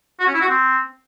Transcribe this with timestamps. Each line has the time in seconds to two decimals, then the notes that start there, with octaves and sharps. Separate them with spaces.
0.20 F#4
0.27 C#4
0.34 E4
0.41 F#4
0.48 C4